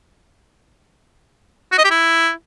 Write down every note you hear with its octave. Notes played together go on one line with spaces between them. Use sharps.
F#4
D#5
G4
E4